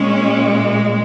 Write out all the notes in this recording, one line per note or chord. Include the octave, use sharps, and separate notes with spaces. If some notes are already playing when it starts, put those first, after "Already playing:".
Already playing: A#2 G#3 C#4